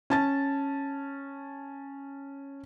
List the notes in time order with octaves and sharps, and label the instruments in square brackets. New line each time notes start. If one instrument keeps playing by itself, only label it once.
[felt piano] C#4 A5 A6